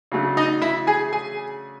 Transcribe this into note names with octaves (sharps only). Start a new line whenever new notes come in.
C#3 F#3 A3 D4
D#4 D#5
E4 E5
G#4 G#5
G#4 G#5